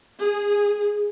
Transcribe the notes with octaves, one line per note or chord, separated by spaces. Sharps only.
G#4